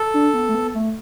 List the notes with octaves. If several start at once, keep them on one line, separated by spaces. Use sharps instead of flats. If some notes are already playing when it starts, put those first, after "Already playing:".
Already playing: A4
D4
B3
A3
B3
A3